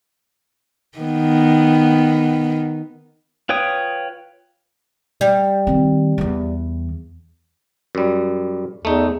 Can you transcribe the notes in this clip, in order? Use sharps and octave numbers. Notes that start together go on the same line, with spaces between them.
D#3 B3
F4 B4 C#5 G5 D#6
G3
D#3 C4
E2 E3
F#2 G3
E2 A3 D#4